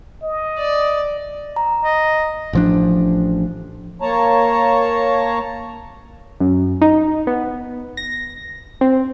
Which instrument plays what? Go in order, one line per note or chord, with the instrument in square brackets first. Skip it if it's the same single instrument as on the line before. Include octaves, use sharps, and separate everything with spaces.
[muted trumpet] D#5
[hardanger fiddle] D5
[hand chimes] A#5
[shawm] D#5
[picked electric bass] A1 F3 D4
[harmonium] A#3 C#5 A5 A#5
[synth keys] F#2
D#4
B3
A#6
C4